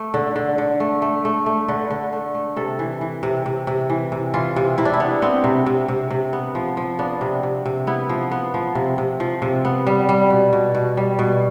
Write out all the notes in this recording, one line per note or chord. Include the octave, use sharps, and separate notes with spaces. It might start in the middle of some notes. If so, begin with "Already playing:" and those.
Already playing: A3
D3
D3
D3
A3
A3
A3
A3
D3 B4
D3
A3
A3
C3 A4
E3
E3
C3
C3
C3
E3
C3
E3 F4
C3
C3 E4
D4
E4
B3
B3 C4
C3
C3
C3
C3
B3
F3
F3
B3 D4
C3
C3
C3
B3 E4
F3
B3
F3
C3
C3
F3
C3
B3
G3
G3
B2
B2
B2
G3
B2